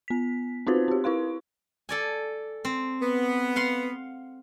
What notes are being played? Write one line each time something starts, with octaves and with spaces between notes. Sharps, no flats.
B3 B6
C4 D#4 F4 F#4 B4 C5
C4 G4
E4 B4 F5 C6
A4 D5 G#5
C4
B3
F5 F#5 C6